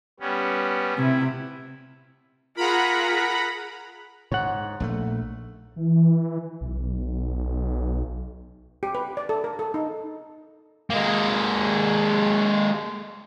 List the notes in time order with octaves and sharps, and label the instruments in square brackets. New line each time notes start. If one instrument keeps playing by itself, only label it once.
[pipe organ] G3 B3 C#4
[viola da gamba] C3 [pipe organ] E4
[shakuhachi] F4 [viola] G#4 A#4 [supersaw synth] F#5 A#5 B5
[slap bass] G#2 [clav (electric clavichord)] C#5 F#5
[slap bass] A#1 D#3 A3
[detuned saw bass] E3
B1
[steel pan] G4
B4
D5
A4
A#4
A4
D#4
[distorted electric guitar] G#3 A#3